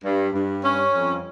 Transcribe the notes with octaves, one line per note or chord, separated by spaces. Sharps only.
G2
G2
C#4
F2